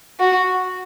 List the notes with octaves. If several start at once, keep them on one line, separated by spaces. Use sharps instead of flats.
F#4